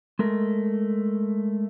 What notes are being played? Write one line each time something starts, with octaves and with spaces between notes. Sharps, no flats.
G#3 A3 A#4